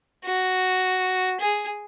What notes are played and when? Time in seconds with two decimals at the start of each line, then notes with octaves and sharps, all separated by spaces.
0.25 F#4
1.40 G#4